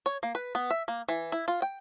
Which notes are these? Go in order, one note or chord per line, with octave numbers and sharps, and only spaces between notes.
C#5
A#3
B4
B3
E5
A#3
E3
E4
F4
G5